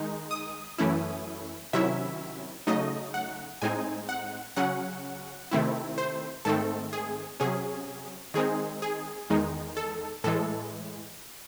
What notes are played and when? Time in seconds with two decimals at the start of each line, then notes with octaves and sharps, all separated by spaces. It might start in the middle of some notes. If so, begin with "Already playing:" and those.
Already playing: D#3 G#3 D#4
0.31 D#6
0.78 F#2 E3 A3 C#4 E4
1.73 C3 D#3 F#3 C#4 E4 E5
2.67 C#3 F#3 A3 D#4 D#5
3.14 F#5
3.62 A2 G#3 C4 D#4 G#5
4.09 F#5
4.56 C#3 F#3 C#4 F#5
5.51 C3 D#3 A3 C4 E4
5.98 C5
6.45 G#2 D#3 A3 C4 A4
6.93 G#4
7.40 C3 F#3 C#4 G#4
8.34 D#3 G#3 C4 D#4 G#4
8.82 G#4
9.30 E2 D#3 G#3 D#4
9.77 A4
10.24 A2 E3 G#3 A4